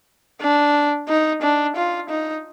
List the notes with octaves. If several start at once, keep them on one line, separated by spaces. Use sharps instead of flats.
D4
D#4
D4
F4
D#4